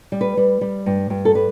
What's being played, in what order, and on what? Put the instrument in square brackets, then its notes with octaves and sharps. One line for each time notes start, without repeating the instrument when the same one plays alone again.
[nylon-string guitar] G3
B4
G3
G3
G2
G2
A4
G3 B4